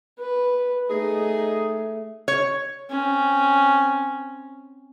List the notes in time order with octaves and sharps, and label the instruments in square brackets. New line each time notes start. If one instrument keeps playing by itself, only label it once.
[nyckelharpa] B4
[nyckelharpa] A3 [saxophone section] D#4 G#4
[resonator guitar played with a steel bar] C#5
[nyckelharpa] C4 C#4